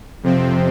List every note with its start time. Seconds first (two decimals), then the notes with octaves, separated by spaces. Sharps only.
0.23 F2 C3 F3 C4